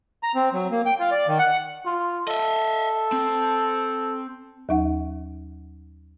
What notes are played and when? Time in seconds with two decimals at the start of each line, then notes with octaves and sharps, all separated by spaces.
0.23 A#5
0.35 C4
0.53 F#3
0.71 A#3
0.86 G5
1.00 F4
1.11 D5
1.28 D#3
1.39 F#5
1.85 F4
2.28 A4 D#5 E5
3.12 C4
4.69 D#2 F#3 D#4 E5 F#5